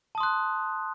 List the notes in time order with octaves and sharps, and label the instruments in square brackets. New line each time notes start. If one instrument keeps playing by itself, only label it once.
[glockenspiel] A5
D#6
C6
F#6